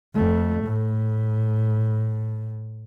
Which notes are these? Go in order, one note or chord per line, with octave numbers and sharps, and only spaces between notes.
F2 A3
A2